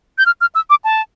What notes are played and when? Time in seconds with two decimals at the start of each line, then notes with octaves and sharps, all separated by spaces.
0.18 G6
0.26 F6
0.41 F6
0.55 E6
0.70 D6
0.84 A5